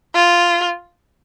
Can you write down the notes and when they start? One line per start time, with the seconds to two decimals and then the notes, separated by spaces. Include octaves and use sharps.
0.14 F4